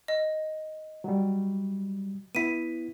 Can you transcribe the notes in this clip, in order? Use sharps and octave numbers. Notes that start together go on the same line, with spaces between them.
D#5
F#3 G3
B3 E4 B6 D#7